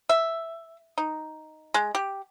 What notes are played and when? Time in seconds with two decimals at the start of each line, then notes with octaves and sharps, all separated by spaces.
0.09 E5
0.98 D#4
1.74 G#3
1.95 G4